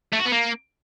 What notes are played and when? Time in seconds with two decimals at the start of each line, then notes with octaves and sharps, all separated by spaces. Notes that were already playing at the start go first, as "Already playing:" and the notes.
0.13 A3
0.19 F#4
0.25 B3
0.32 A#3